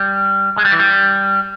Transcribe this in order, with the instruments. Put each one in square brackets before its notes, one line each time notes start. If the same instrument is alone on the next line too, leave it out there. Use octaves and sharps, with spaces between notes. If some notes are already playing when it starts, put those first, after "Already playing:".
Already playing: [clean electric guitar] G3
G#3
G3
E3
G3